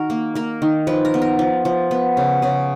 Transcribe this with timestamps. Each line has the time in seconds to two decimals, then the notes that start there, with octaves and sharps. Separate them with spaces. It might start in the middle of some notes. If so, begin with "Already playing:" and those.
Already playing: D#3 F#4 A#4
0.10 A#3
0.35 A#3 A#4
0.62 D#3
0.87 F3 B4
1.05 A#4
1.14 B3
1.22 A#4
1.39 F3
1.65 F3
1.91 B3
2.17 C#3
2.42 C#3 G#4